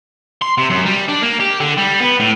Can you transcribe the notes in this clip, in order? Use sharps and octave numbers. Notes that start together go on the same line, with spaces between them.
C6
C3
F#2
G3
D4
A#3
G4
D3
G3
B3
A2